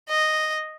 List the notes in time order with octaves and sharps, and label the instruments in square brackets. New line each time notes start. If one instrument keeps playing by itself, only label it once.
[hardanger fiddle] D#5